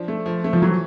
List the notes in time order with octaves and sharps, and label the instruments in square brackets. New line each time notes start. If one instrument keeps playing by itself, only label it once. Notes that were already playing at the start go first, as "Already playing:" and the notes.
Already playing: [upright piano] F3 D4
A3
F3
A3
[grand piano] F3
[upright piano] E3 [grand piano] F#3